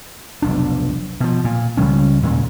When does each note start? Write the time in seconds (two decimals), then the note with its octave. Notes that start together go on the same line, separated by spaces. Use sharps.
0.42 F1 B1 D4
1.20 B2 F3
1.45 A#2
1.77 C#2 C#3 G3 C#4
2.23 D#2 A#2 C#3 G#3